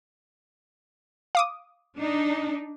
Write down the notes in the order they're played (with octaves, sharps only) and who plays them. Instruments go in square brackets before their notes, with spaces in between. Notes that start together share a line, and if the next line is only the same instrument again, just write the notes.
[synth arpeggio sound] F5 D6 D#6
[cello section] D4 D#4